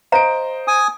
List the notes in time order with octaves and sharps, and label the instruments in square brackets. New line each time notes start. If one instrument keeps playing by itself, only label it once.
[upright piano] C5 D#5 D7 [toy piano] F5 A#5
[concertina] G#5 D#6